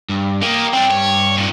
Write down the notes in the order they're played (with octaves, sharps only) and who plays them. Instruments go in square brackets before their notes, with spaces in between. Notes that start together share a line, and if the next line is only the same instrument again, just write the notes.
[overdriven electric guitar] G2
[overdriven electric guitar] A#3 [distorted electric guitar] G4 D#5
[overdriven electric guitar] G2 G5 [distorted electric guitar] C4 D4
[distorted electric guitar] C#5
A#2 D#3